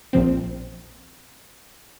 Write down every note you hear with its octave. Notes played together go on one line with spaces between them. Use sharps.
A#1 A#2 F3 C4